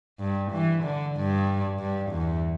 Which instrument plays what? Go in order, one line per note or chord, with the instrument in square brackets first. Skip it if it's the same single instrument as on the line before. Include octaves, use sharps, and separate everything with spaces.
[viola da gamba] G2
E3
D3
G2
G2
E2